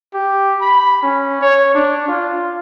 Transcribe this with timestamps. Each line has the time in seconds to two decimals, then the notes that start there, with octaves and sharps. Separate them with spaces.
0.14 G4
0.61 B5
1.03 C#4
1.42 C#5
1.75 D4
2.08 F4